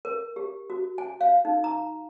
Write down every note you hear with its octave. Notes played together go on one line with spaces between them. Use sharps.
A#4
G4
F#4
G#5
F5
D#4
A#5